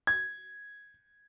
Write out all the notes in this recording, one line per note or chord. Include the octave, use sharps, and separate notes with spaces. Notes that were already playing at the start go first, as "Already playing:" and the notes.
G#6